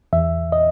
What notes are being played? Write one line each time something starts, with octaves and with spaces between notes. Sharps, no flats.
E2 E5
D#5